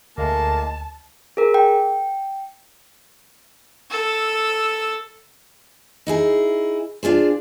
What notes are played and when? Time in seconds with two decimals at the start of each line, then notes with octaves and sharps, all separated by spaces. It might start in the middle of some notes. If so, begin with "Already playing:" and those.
0.18 D2 A2 G#3 A#3 A5
1.37 G#4 A#4
1.54 G5
3.90 A4 E6
6.07 D#4 E4 G#4
7.03 D4 F4 G#4 C5